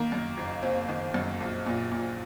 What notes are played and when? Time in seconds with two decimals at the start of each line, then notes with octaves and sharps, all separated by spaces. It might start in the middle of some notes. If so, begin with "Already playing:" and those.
Already playing: D#3 A#3
0.12 F#2
0.37 F#1
0.63 F#1 C4
0.89 D#3
1.14 F#2
1.41 A#1
1.66 A#2
1.91 A#2